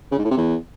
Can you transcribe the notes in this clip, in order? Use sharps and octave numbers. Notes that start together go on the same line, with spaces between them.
C#3
G#2
A2
C3
E2